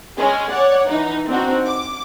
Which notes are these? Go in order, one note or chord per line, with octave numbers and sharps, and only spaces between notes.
G#3 C#4 G#4
C#5 D5 F#5
E3 D#4
C4 D4 D#4 F#4
D6